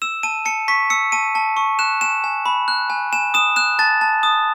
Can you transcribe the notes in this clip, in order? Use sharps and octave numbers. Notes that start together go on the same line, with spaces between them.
E6 E7
A5 D#7
A5 C#7
C#6 B6
E6 C#7
A5 D#7
A5
C#6
F#6 E7
G#5 E7
G#5
B5
F#6
G#5
G#5 E7
D#6 E7
F#6 E7
A5 A6
A5
D#6